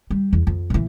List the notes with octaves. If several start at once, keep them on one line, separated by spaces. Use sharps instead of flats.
G3
E2
F2
A#2 E3